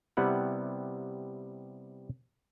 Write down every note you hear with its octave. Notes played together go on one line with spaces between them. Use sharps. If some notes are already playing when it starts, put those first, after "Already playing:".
C3 G3 B3 E4 F#5